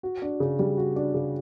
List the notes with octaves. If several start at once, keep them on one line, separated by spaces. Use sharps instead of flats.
F#4
D4
C#3
G3
F#4
D4
C#3